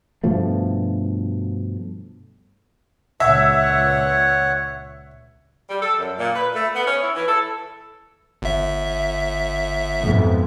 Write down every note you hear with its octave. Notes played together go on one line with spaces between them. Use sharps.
G2 B2 F3 A3
C#2 A#2 C#5 E5 F#5
G3
A4
F#2
A#2
B4
A3
B3
C#4
E4
E3
A4
G1 E5
F2 G#2 B2